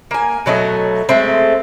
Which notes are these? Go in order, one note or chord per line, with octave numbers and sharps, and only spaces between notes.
A#3 G#5
B2 F#3 A3 D#5
G#3 A3 C4